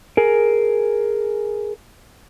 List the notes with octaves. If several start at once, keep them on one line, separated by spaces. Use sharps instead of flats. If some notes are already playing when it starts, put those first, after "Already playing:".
G#4 A#4